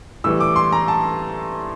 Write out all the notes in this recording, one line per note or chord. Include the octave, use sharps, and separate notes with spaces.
A2 E3 G3 E6
D6
C6
A#5
A5